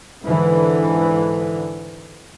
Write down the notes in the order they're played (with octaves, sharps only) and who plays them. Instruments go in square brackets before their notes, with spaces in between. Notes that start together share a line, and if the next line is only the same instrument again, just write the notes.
[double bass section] G#2 D3 E3